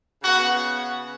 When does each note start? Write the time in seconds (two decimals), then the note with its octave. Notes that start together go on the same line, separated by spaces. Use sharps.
0.23 C#3 B3 F#4